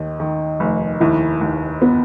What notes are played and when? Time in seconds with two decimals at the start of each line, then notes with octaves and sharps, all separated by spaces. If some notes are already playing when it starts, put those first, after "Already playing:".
Already playing: D#2 D#3
0.20 D#3
0.60 F1
1.00 D#2 E4
1.41 D#2
1.82 B3